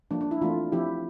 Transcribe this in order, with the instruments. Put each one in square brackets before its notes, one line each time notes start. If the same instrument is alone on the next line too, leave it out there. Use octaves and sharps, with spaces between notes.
[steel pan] F3 A#3 D4
D4
E4
E3 A3 C4 D4 F4
F3 C4 E4 G4